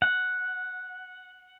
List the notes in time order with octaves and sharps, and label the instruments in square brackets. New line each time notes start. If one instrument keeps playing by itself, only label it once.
[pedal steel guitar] F#5